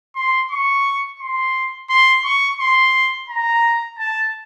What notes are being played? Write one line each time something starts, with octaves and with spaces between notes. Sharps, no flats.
C6
C#6
C6
C6
C#6
C6
A#5
A5